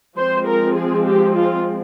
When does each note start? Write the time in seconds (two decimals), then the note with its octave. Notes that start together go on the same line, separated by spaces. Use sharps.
0.17 F3 G#3 C4 C5
0.46 A#4
0.75 G#4
1.05 G4
1.35 F4